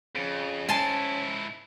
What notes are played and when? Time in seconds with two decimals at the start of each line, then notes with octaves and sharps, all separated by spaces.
0.15 F2 C#3
0.69 G#2 C#4 E4 G#5 A5 C6